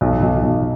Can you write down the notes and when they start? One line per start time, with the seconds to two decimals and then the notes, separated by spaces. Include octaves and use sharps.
0.01 B1
0.22 B1
0.43 B1